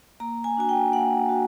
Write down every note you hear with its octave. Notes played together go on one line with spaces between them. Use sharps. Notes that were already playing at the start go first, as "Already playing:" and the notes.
A#3 A#5
G#5
D4 F#4 G#5
G5
A#3 F#5
F#4